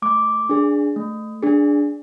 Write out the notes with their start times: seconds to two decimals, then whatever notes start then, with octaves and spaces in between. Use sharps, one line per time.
0.02 A3 D6
0.49 D4 G#4
0.96 A3
1.43 D4 G#4